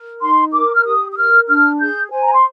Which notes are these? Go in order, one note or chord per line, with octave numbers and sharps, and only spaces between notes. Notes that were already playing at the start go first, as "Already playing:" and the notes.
Already playing: A#4
D#4 C6
A#4 D6
F6
G4 D#6
D#6
A#4 F6
D4 F6
G#4 G6
C5 G#5
A#5
C6